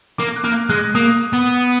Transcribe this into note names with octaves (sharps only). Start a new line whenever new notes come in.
A#3 D6
F#6
A#3 F6
G#3 F#6
A#3 D#6
B3